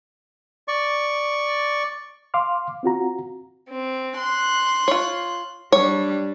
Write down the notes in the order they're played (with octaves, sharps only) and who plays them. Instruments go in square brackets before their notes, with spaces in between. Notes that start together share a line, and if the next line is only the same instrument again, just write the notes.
[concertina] D5 C#6
[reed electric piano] F5 C6 D6 F6
C4 F4 F#4 A#5
[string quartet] C4
C6 F#6
[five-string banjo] F4 C#5
[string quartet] G3 D4 [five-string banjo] C#5